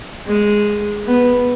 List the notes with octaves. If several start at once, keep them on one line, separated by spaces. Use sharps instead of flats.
G#3
B3